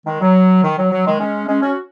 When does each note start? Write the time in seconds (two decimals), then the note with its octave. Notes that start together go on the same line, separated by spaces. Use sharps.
0.07 D#3 G#3
0.21 F#3
0.64 D#3
0.78 F#3
0.92 F#3
1.06 D#3 G#3
1.20 G#3 C#4
1.48 G#3 C#4
1.63 C#4 F#4